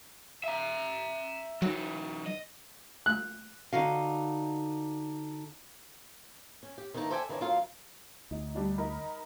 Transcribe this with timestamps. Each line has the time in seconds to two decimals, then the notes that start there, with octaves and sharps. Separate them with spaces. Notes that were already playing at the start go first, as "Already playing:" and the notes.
0.44 E5 A#5
1.62 E3 F#3 D#4
2.26 D#5
3.06 F#6
3.73 D3 D#4 F#4 F5
6.63 C#4
6.78 G4
6.94 D#3 E3 A#3 B3 D#4 A4
7.10 A4 C5 D5 E5 G5 G#5
7.29 D#3 E3 C4 D4 F#4 C#5
7.41 D2 F#3 F4 A#4 F5
8.31 D2 D#4
8.54 G3 D4 D#4
8.78 D#4 A#4 B5